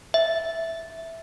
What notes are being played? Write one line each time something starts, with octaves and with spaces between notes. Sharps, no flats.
E5